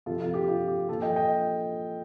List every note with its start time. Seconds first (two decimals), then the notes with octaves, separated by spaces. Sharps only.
0.06 C3 F3 F4 A4
0.20 F4
0.34 G4
0.48 F4
0.68 G4
0.88 A#2 F4 A4
0.92 F3
1.02 D#5 G5
1.16 D#5 G5